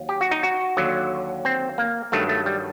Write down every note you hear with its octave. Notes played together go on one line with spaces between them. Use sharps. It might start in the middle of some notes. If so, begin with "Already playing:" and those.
Already playing: D#2 F#3
G4
F#4
D#4
F#4
D#2 D3 F#3
C4
A#3
G2 D#3 F#3 A3
A3
G3